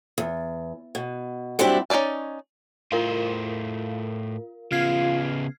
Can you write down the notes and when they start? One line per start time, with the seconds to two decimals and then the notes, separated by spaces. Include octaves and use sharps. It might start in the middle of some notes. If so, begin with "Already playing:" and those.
0.18 E2
0.95 B2
1.59 F#3 G3 C4 D4 E4 G4
1.90 C#4 D#4 G#4 D5 A5
2.92 A2 F4 A#4 C5 F5
4.72 C#3 B3 F4 F6 G#6 C7